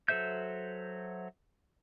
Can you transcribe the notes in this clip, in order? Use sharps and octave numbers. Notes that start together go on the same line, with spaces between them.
F#3 A4 C5 E5 G6